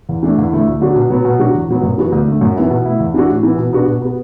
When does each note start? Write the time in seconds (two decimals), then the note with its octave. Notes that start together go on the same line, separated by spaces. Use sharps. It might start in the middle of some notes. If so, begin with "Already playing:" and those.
0.09 E2
0.23 E3 A3 D4
0.38 E2
0.52 D3 A3 E4
0.66 D2
0.81 D3 F#3 D4 F#4
0.96 B2
1.10 F#3 B3
1.25 B2
1.40 F#3 D4 F#4
1.54 E2
1.68 B2 F#3 B3
1.83 F#2
1.98 E3 B3 F#4
2.12 D2
2.27 D3 A3
2.41 F#2
2.56 E3 B3 E4
2.70 B2
2.85 A3 E4
3.00 E2
3.14 E3 D4 F#4
3.29 A2
3.43 E3 B3
3.58 B2
3.73 B3 D4 F#4
3.88 B2
4.02 B3 F#4